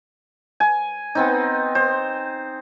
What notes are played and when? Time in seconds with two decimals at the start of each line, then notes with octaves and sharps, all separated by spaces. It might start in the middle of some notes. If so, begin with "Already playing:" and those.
0.60 G#5
1.15 B3 C4 D#4
1.75 C5